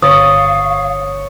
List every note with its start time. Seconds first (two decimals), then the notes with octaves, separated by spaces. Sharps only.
0.02 G1 C#5 F5 C#6 D#6 A6